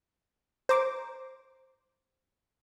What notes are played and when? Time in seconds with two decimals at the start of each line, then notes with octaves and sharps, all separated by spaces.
0.69 C5 A#5 D6